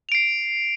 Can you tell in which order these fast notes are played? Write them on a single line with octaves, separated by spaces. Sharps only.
F7 D7 C7